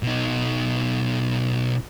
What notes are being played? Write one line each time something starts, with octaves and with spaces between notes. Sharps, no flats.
B2 D#4